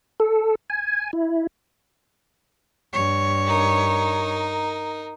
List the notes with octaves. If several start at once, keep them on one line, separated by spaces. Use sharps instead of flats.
A4
G#5
E4
G2 C#5
D#4 A#4